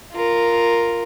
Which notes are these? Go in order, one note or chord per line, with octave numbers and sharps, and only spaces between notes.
F4 A#4